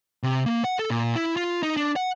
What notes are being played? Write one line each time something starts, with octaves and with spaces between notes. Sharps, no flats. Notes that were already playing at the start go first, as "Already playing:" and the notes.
C3
A#3
F#5
A4
A#2
E4
F4
D#4
D4
F#5